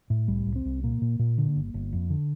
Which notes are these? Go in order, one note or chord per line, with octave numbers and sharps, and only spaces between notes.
A2
C2 G3
C2
C4
C2
A#2 A#3
A#2
A#2
D3
G1
G1
F2
D3